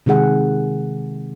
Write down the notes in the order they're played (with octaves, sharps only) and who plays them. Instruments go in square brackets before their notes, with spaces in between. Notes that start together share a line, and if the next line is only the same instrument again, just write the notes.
[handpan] C3 D#3 G#3 G#4 F#5